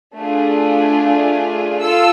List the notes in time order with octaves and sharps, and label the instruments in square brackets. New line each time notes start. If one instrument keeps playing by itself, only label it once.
[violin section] A3 D4 F4 G#4
F4 A4 E6